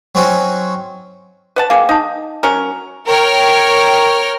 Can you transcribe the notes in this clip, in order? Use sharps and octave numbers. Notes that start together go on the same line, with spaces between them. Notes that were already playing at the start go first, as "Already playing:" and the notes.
F#3 C4 C#4 D#4 F#4
B4 F#5 A5
A#3 G#4 F5 G5
D#4 A5 D#6
F#3 C#4 A#4
A#4 C#5 G5 F6